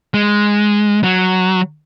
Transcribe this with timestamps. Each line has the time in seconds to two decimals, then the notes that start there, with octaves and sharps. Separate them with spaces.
0.14 G#3
1.03 F#3